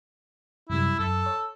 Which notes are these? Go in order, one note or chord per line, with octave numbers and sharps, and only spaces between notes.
F#2 C3 G3 E4
F#2 A4
C#5